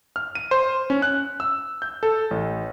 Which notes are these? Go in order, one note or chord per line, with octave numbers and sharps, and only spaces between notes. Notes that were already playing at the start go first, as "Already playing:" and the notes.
F6
D#7
C5
C#4
F#6
E6
G6
A4
A1